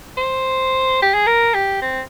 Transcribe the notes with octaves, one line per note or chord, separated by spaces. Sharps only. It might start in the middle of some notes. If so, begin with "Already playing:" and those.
C5
G4
G#4
A#4
G4
C4